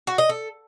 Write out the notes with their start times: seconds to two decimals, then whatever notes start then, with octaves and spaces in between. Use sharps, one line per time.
0.07 F#4
0.18 D#5
0.29 A4